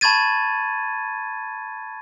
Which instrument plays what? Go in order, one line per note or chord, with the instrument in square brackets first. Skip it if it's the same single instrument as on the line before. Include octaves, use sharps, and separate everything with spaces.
[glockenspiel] A5 B5 C#6 G#6 A6 D#7